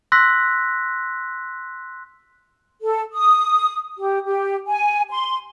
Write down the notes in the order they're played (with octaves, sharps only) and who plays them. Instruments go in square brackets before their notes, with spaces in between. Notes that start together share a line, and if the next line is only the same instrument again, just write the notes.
[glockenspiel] C6 E6 F#6 A#6 B6
[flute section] A4
D#6
G4
G4
G#5
C6